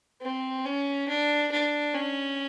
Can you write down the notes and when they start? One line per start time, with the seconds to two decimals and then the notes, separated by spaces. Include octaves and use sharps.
0.21 C4
0.65 C#4
1.08 D4
1.52 D4
1.94 C#4